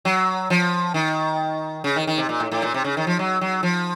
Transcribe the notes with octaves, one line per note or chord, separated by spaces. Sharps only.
F#3
F3
D#3
C#3
D#3
D#3
C3
A#2
A2
A2
A#2
C3
C#3
D#3
F3
F#3
F#3
F3